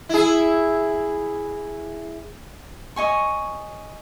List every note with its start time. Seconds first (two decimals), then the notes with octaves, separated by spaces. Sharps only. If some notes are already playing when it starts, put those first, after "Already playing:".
0.09 E4 G#4
2.96 C#5 D#5 G#5 C#6